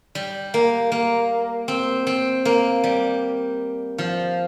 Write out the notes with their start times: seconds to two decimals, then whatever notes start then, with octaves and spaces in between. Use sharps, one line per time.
0.15 G3
0.54 A#3
0.92 A#3
1.68 C4
2.07 C4
2.45 A#3
2.84 G3
3.98 F3